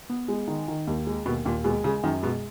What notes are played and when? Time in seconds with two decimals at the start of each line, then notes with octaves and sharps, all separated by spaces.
0.09 B3
0.28 G#3
0.48 D#3
0.68 D#3
0.87 D#2
1.07 G#3
1.26 D#2 B2
1.45 D#2 A#2
1.64 B2 G#3
1.84 C#3 G#3
2.03 F#2 D#3
2.23 B2 G#3